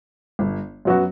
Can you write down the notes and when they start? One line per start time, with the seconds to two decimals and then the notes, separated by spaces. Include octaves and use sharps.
0.39 G1
0.85 F#2 F#3 B3 F#4